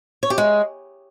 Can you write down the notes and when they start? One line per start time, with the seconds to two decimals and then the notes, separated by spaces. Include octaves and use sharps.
0.23 C#5
0.30 G4
0.38 G#3